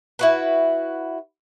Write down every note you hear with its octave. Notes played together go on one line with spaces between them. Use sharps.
E4 F#4 B4